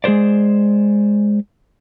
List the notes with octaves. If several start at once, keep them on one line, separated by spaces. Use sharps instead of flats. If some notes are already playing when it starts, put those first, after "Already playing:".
G#3 G#4 B4 C5 D5